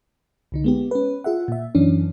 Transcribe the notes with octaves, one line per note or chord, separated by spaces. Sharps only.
C2 D3 D#4
G#3 B3 G4
C#4 B4
F4 G#4 E5 F#5
A#2 E5
F#2 E3 C#4 D4